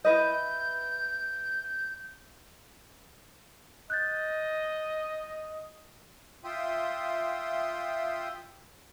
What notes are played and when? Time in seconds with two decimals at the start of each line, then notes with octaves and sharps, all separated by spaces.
0.05 E4 B4 D#5 G6
3.90 D#5 F#6 G6 A6
6.44 F4 E5 G5 C6 D#6